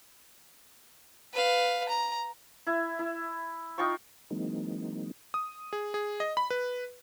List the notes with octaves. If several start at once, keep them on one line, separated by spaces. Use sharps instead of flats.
B4 F5
A#5
E4
E4
D#4 F4 G5 C#6
E3 F#3 G#3 A#3 C4 D#4
D#6
G#4
G#4
D#5
B5
B4